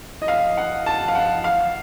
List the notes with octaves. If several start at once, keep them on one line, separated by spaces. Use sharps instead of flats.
D#5
F5
F#5
A5
F5
F#5
F5